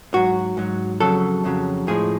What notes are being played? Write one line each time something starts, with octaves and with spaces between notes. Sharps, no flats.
G#2 F#3 F#4
G#2 F#3
F2 C#3 F#3 A4
F2 C#3 F#3
A2 F3 G#3 G#4